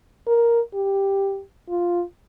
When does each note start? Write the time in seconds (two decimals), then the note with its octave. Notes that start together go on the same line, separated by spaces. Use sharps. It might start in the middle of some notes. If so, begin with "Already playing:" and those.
0.27 A#4
0.74 G4
1.69 F4